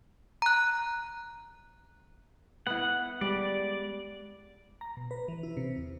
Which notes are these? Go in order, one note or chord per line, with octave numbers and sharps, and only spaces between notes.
A#5 F#6
B3 E4 F#5
G3 G#3 D5
A#5
B2
B4
E3
E4
C3
E2